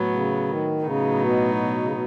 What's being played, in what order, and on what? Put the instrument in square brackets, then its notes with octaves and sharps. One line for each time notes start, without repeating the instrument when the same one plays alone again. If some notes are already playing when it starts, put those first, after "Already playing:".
Already playing: [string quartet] A2 F#3 B3
[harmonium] C#3
D#3
[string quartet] A2 F#3 B3 D#4 [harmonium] C#3
[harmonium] B2
B2
C#3
B2